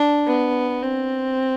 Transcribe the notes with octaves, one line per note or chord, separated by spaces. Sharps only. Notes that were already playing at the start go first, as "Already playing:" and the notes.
Already playing: D4
B3
C4